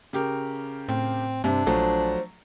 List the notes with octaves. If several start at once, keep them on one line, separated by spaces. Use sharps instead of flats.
C#3 G4 A#4
A2 C4
G2 C3 C4 D4
A#1 F3 F#3 A3 C5